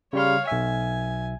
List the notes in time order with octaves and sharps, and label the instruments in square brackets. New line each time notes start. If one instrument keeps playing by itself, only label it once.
[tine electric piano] C#3 G3 C6 [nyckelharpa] C#5 F5
[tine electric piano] B1 E5 [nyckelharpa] G#5